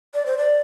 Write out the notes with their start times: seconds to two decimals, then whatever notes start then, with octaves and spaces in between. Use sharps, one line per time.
0.14 D5
0.26 C5
0.38 D5